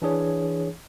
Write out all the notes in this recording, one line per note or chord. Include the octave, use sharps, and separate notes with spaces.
E3 D4 G#4 C#5